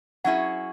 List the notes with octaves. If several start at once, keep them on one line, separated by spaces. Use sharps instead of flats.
F#3 C#4 E4 G#4 F#5